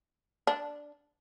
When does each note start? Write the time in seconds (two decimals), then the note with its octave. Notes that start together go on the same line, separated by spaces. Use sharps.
0.47 D4